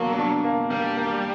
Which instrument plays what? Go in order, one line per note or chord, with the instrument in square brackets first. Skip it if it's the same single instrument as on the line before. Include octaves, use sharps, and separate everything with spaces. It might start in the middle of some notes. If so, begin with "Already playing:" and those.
Already playing: [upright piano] B2 A#3 D4 [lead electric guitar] F#3
[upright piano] D4
A#3
[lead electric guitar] G3 [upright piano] A#3
[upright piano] A#3